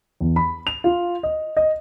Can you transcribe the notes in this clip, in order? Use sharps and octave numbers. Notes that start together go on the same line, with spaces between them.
E2
B5
F7
F4
D#5
D#5